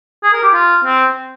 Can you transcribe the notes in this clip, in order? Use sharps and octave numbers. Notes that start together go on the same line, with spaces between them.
G#4
A#4
G4
F4
C4